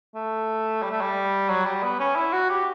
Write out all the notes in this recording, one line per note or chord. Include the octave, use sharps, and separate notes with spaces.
A3
G3
A3
G3
F#3
G3
B3
C#4
E4
F#4
G4